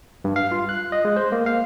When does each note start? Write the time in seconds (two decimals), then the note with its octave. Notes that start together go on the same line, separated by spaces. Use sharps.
0.24 G2
0.36 F5
0.51 F4
0.69 F#6
0.92 D#5
1.05 G#3
1.16 C5
1.32 A#3
1.46 F5